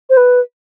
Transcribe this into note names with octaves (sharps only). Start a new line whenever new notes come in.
C5
B4